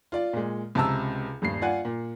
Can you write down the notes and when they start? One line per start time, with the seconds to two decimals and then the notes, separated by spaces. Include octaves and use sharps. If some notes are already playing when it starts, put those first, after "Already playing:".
0.12 F4 D5
0.33 A#2 G#3
0.75 C#2 C3 A5 A#5 E6
1.42 D#1 G2 C7
1.62 F4 D5 F#5 G#5
1.85 A#2